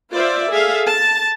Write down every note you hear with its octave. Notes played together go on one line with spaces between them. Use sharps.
F4 C5 D5 E5
G#4 A4 E5 F5
A5